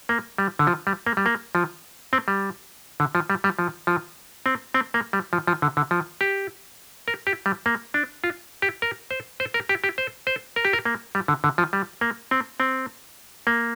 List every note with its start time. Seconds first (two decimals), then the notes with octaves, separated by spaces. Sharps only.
0.09 A#3
0.38 G3
0.59 D3
0.67 F3
0.87 G3
1.07 A#3
1.17 G3
1.26 A#3
1.55 F3
2.13 C4
2.28 G3
3.00 D3
3.15 F3
3.30 G3
3.44 G3
3.59 F3
3.87 F3
4.46 C4
4.74 C4
4.94 A#3
5.13 G3
5.33 F3
5.47 F3
5.62 D3
5.77 D3
5.91 F3
6.21 G4
7.08 A#4
7.27 G4
7.46 G3
7.66 A#3
7.94 D4
8.24 F4
8.62 G4
8.82 A#4
9.11 C5
9.40 C5
9.54 A#4
9.69 G4
9.84 G4
9.98 C5
10.27 C5
10.56 A#4
10.65 G4
10.73 A#4
10.85 A#3
11.15 G3
11.28 D3
11.44 D3
11.58 F3
11.73 G3
12.01 A#3
12.31 C4
12.60 C4
13.47 A#3